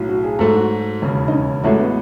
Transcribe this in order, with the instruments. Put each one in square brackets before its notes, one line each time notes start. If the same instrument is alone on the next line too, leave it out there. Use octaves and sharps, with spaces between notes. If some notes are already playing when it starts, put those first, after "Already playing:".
Already playing: [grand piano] B1 A2 F#3
[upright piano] F#4
G#4
[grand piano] G#2 F#3 A3 [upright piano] A4
[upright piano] F#4
[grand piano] E1 D#2 C#3
[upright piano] D#4
C#4
[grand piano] A1 A2 G#3 C#4 F#4 [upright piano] A3
[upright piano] B3